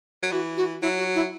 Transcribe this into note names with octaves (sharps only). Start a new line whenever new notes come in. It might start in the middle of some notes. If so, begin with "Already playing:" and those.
F#3
E3 F#4
F#4
F#3 E4
F#4
E4